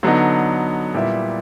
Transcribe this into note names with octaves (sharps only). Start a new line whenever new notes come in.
D3 F#3 B3 D#4
A#2 G3 B3 E4